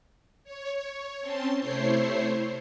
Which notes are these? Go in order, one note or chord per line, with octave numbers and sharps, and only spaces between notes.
C#5
C4 C#4 A5 C6
C3 A3 E4 C5 C#5 C7